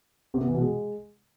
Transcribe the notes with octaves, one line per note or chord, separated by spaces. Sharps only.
C3
B3
E3
B2
G#3